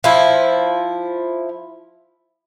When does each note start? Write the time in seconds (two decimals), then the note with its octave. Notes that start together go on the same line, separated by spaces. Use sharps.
0.04 F3 E4